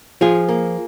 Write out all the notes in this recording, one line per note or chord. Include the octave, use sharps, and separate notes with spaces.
F3 F4 G#4
A#3